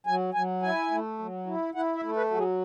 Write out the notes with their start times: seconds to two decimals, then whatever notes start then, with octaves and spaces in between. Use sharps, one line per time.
0.07 F#3 G#5
0.34 F#3 G#5
0.62 E4 G#5
0.91 A3
1.19 F#3
1.46 E4
1.74 E4 F#5
1.95 E5
2.02 A3
2.16 B4
2.31 F#3 F#4
2.37 G#4